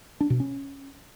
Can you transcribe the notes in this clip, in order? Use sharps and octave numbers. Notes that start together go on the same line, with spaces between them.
D4
B2
C#4